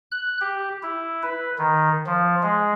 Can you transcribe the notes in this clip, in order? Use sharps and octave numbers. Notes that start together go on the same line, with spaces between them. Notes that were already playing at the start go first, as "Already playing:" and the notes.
F#6
G4
E4
B4
D#3
F3
G#3